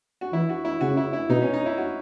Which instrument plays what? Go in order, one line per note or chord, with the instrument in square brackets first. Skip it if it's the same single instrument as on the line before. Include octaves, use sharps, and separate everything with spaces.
[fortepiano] F#4
[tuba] E3 [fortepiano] E4
[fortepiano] F#4
E4
[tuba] C#3 [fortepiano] F#4
[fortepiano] E4
E4
[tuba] B2 [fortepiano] D#4
[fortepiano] C#4
D#4
E4
F#4